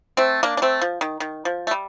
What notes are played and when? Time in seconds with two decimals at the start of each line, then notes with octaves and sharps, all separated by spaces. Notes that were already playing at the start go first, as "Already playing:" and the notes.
0.17 A3 C4
0.43 A#3 D4
0.57 D4
0.62 A3 C4
0.81 F3
1.01 D#3
1.20 D#3
1.45 F3
1.67 A3
1.71 G3